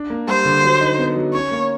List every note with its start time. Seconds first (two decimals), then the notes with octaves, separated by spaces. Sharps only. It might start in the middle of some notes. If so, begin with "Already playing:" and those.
Already playing: D4
0.10 A#3
0.28 G3 C5
0.45 D3
0.63 F#3
0.80 D#4
0.99 B3
1.16 F#3
1.33 C#4 C#5
1.51 A#3